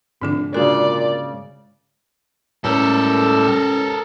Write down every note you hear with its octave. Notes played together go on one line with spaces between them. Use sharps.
F1 G#2 D3 D4
A#2 C#3 G#3 D4 F#4 D5
A2 G3 G#3 C#4 A4 A#4 C#5 E6